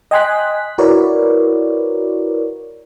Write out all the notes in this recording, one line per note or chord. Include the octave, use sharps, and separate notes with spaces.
D#5 G5 G#5 C6 F#6 B6
E4 F#4 A#4 B4 C#5 D5